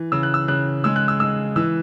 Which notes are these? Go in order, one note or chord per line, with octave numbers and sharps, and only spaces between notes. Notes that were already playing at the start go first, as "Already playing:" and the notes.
Already playing: E3
C#3 E6
F#6
E6
C#3 F#6
G#3 E6
F#6
E6
G#3 E6
E3 E6